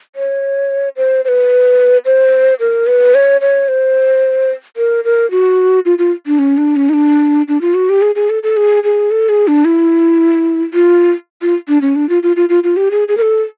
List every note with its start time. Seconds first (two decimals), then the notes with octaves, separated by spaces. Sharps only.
0.16 C#5
0.97 C5
1.25 C5
1.28 B4
2.05 C5
2.60 A#4
2.87 B4
3.15 C#5
3.41 C#5
3.68 C5
4.77 A#4
5.05 A#4
5.31 F#4
5.85 F4
5.99 F4
6.27 D4
6.39 C#4
6.57 D4
6.76 C#4
6.89 D#4
6.94 D4
7.48 D4
7.61 F4
7.75 F#4
7.89 G4
8.02 G#4
8.15 G#4
8.30 A4
8.43 A4
8.57 G#4
8.84 G#4
9.11 A4
9.29 G#4
9.48 D4
9.65 E4
10.74 F4
11.42 F4
11.69 D4
11.81 C#4
11.96 D4
12.09 F4
12.23 F4
12.36 F4
12.49 F4
12.64 F4
12.77 G4
12.91 G#4
13.08 G#4
13.17 A#4
13.22 A4